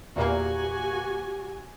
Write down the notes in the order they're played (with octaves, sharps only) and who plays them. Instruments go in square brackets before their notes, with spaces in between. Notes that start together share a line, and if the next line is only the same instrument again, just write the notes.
[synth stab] E2 A#2 A#3 [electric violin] F#4 G#5 [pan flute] G4